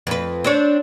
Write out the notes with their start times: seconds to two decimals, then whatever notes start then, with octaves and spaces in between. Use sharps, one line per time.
0.07 F2 B4
0.44 C4 D4 C#5